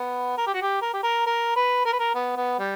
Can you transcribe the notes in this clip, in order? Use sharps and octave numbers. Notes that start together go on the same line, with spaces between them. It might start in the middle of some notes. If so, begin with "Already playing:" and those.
Already playing: B3
A#4
G4
F#4
G4
A#4
G4
A#4
A#4
B4
A#4
B4
A#4
B3
B3
G3